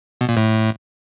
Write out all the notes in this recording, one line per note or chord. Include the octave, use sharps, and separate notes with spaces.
B2
A#2
A2